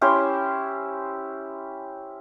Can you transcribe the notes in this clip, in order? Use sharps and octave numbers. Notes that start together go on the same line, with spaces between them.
C#4 E4 G4 C5